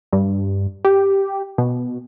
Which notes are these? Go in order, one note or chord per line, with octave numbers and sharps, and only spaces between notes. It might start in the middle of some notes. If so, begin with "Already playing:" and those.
G2
G4
B2